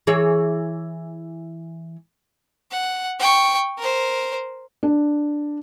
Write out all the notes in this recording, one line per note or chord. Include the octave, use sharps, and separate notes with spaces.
E3 G#4 C#5
F#5
G5 C#6
A#4 C5
D4